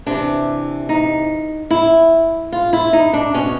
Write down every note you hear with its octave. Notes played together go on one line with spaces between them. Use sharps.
C3 E3 D4
D#4
E4
F4
E4
D#4
D4
B2 C#4